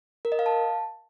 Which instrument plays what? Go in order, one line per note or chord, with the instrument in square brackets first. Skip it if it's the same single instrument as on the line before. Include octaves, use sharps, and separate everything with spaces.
[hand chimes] A#4
D#5
F5
A5